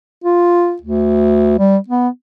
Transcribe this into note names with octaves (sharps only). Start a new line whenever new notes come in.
F4
D2
G3
B3